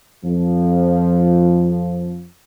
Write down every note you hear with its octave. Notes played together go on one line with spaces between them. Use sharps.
F2 F3